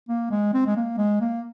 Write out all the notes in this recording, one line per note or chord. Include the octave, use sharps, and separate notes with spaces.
A#3
G#3
C4
G#3
A#3
G#3
A#3